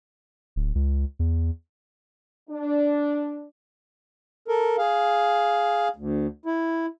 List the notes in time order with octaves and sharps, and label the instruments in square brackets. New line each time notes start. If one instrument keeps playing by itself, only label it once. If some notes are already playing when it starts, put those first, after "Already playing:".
[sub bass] D1
C#2
E2
[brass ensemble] D4
[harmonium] A4 A#4
G#4 F5
D2
E4